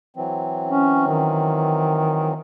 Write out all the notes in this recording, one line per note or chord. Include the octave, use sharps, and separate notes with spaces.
E3 F#3 C4
C#4
D#3